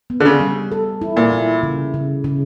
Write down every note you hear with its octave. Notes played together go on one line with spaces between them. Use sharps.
B3
D3
C#3
G3
A4
E4
A#2
E4
C#3
C#3
C#3